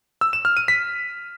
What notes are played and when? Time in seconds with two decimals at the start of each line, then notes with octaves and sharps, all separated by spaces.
0.21 E6
0.33 E7
0.45 F6
0.57 D#7
0.68 B6